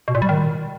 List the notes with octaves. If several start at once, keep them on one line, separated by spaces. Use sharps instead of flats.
B2
A#2
G3
D#3